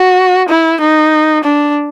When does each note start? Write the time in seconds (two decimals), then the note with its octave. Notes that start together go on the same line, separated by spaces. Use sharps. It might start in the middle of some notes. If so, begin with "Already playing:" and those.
Already playing: F#4
0.49 E4
0.80 D#4
1.44 D4